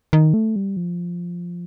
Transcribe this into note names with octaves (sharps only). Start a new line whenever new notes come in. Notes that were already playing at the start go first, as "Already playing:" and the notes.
D#3
A3
G3
F3